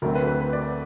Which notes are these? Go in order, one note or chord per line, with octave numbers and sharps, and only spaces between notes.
D2 D3 F#3 A3 C4 A#4
B4
B4
B4
D5